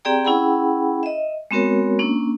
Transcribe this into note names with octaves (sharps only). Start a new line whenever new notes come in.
C4 G4 G#4 D5 G5 A#5
C#4 E4 G#4 F#5 G5 B5
D#5 E5
G#3 B3 C4 F#4 A#4 C#5
A#3 C#4 D4